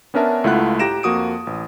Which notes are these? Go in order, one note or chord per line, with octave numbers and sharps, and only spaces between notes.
B3 C#4 D4 A#4 E5 A5
C#2 A3 E4 F4 F#5 F#6
A2 G4 A#5 A#6 D7 E7
F2 A#3 F#4 D#6 D7
A1